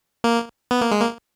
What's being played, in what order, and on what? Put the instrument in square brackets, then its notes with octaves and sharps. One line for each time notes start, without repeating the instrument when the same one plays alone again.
[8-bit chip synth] A#3
B3
A#3
G#3
A#3